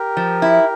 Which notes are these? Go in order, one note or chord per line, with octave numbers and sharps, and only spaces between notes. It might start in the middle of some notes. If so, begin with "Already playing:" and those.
Already playing: G4 A#4
F3
E4